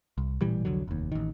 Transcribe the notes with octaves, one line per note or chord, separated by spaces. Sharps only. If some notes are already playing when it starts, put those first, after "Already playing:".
C2
A1 A#2 E3 G3
C2 F2 D3 F#3
F1 D#2
A1 D#3